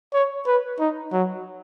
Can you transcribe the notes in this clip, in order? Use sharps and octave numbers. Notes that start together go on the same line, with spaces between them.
C#5
B4
D#4
F#3